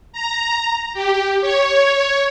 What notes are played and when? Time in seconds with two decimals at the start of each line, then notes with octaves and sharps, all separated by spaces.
0.12 A#5
0.94 G4
1.41 C#5